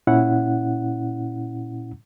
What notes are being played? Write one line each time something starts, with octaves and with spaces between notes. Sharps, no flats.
A#2 C#4 E4 F#5